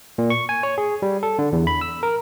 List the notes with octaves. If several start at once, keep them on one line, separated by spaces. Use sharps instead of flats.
A#2
C#6
G#5
C#5
G#4
G3
A4
D3
E2
B5
E6
A#4